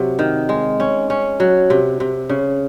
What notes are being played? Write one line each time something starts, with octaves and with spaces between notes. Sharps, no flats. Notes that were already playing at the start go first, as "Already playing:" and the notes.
Already playing: C3 F#3
D#3
G#3
C#4
C#4
F#3
C3
C3
C#3